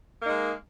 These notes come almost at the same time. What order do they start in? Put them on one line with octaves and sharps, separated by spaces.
A#3 D#4 G#3